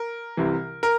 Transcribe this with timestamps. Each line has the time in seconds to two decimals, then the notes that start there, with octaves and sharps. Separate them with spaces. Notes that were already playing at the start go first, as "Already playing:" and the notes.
Already playing: A#4
0.37 C2 C3 E3
0.83 A#4